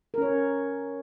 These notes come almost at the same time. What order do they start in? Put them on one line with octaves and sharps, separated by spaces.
A#4 C#4 C#5